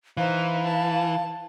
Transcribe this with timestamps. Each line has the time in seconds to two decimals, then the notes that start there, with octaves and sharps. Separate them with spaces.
0.17 E3 D#4 C5 F5
0.65 A5